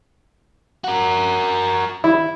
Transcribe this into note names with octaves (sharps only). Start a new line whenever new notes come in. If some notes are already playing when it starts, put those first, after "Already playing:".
F#4 A#4
E4